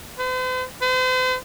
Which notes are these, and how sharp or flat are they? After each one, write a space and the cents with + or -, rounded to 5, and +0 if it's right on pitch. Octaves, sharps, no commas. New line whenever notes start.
C5 -45
C5 -45